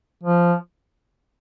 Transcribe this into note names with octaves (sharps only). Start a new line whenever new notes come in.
F3